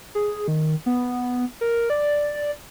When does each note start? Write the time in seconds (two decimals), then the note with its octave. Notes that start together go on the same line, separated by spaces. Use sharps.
0.15 G#4
0.48 D#3
0.86 B3
1.61 A#4
1.90 D5